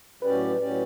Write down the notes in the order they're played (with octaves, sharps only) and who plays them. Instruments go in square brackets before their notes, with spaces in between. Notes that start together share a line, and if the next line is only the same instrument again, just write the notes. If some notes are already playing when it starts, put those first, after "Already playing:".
[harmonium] A2 F#3 C#4 G4 D5 [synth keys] B4
[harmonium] A2 F#3 C#4 G4 D5